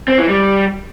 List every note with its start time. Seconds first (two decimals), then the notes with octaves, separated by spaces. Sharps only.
0.08 C4
0.18 E3
0.29 G3